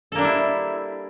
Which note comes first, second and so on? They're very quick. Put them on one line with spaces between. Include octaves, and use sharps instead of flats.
A4 A#3 D4 G3 E4